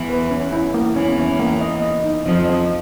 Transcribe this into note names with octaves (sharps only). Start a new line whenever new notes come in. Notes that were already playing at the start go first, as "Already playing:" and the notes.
Already playing: E2 E3
B4
C#4
E4
A#3
E2 E3 C#4
C#4
A#3
D#5
D#5
D#4
F2 F3 D#5
D#5